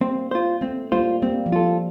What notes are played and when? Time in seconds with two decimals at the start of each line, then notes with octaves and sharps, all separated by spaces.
0.01 G3 A#3 C4
0.31 F4 C5
0.61 A3 C4
0.92 G3 A#3 F4 C5
1.22 G3 A#3 C4
1.46 F3
1.52 G3 F4 A4